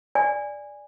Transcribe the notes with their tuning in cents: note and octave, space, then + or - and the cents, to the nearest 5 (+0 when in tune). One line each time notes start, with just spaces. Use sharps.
D5 +0 G#5 -15